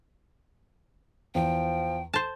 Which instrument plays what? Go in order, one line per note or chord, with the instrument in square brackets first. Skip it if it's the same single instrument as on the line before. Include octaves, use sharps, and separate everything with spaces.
[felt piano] E2 [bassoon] F3 [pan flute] G5
[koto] C5 A5